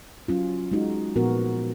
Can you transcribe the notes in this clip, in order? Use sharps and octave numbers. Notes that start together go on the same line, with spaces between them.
F#3 C#4 F4
G#3 D#4 F#4
A#2 F3 B3 F#4 A#4